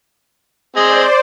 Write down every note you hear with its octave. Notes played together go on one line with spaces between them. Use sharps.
C4 G#4 C5 D5 D#5